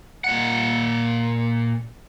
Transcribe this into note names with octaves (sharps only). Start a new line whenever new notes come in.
A#2 F#5